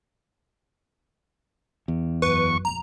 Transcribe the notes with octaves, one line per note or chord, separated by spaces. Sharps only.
E2
A1 F#2 B4 C#6
D#1 F2 A#5